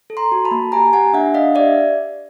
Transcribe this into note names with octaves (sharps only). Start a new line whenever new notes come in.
A4
A#5 C6
F#4
A5 B5
A#3
G4 G#5 A#5
G4 F#5 G#5
D4 E5 F#5
D4 D#5 F5
G4 D5 E5